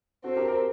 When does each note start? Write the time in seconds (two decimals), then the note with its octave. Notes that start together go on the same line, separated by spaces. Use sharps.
0.24 C4 F#4 A4
0.36 G4 A#4
0.48 G4 A#4